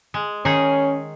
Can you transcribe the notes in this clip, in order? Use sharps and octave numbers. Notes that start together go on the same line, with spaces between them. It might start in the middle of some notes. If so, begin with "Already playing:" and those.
G#3
D#3 C#4 D#4 G#4